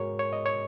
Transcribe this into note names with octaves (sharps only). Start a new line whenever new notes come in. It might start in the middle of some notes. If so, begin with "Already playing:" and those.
Already playing: G#2 G#3 F#4 G#4 A#4 C#5
C#5
D#5
C#5